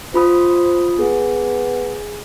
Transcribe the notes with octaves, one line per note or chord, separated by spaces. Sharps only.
F4 C5 B5 D#6
B3 G#4